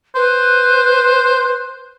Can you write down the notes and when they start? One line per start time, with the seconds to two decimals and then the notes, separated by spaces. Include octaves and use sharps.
0.15 B4 C5